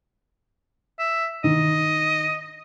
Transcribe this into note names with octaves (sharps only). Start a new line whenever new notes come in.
E5
D#3 D#5